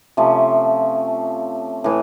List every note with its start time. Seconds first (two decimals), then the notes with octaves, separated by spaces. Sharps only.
0.17 C3 F3 A3 C#4
1.84 A2 E3